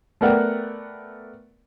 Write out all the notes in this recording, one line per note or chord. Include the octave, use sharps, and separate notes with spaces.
A3 B3 A#4 D5 F#5 G5